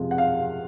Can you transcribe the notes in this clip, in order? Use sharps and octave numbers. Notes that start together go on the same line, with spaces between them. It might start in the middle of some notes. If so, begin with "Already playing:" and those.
Already playing: F2 C3 F3 G#3
F#5
F5